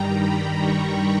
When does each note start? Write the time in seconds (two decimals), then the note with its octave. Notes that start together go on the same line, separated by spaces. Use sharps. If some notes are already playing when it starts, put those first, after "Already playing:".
Already playing: G2 D#3 G3 G5 A#5
0.19 B5
0.59 C#6